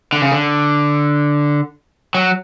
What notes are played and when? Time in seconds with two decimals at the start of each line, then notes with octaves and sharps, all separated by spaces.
0.13 D3
0.22 C#3
0.32 D3
2.15 F#3